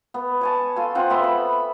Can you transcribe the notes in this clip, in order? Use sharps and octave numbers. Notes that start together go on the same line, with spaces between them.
B3
C#5 G#5 A5
F4 A4 G#5
C4 F4 F#5
B3 E5 B5 C6
B5